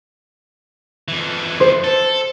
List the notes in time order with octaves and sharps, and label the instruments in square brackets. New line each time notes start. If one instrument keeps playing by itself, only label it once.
[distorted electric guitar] F2 E3
[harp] C5
[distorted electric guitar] A4